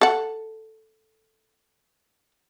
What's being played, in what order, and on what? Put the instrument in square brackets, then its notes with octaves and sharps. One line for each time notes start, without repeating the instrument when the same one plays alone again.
[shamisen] A4 F#5